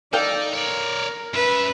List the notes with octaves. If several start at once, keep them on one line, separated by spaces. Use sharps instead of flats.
D#4 A4 D5 F5 G5
A#4 C#5 D5
F#2 B4 E5